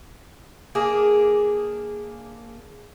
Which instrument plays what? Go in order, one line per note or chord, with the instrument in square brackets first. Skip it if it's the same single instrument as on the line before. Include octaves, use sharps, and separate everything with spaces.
[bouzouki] A#3 D4 G#4